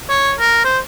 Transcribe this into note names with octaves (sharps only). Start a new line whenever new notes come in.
C#5
A#4
C5